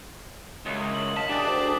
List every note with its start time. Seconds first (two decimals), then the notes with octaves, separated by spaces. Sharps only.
0.66 C#2 F#2 E4 D#6
0.95 F#7
1.17 D#5 F5 F#5 A5 B6 E7
1.29 D4 G4 G#4 D5
1.47 D2